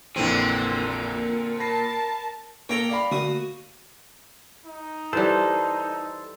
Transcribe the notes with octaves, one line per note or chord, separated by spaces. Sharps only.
A#1 F2 A#2 D3 E3 C4
A#4 A5 B5 A#6 C7
A#3 A4 C#5 G5 A#5
D5 F5 B5
D3 A3 A#3 F#4 D#6
D#4
E3 G3 A4 C5